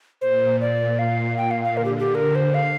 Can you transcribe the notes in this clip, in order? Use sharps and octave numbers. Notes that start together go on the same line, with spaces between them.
A#2 C5
A#2 D5
A#2 F5
A#2 G5
F5
F5
D3 A#4
G4
G4
A#4
C5
F5